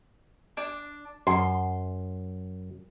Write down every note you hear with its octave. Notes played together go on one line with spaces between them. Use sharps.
D4
F#2 C6